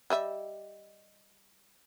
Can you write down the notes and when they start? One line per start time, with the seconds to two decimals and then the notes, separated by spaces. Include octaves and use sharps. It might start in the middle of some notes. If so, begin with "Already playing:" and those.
0.10 G3 D#5 E5